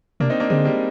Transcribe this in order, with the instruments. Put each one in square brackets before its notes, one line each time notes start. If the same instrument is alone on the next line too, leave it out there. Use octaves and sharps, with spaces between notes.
[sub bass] C3 [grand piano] A#3 D4
[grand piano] C4 D#4
A#3 D4
[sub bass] D3 [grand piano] G#3 C4
[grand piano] G3 A#3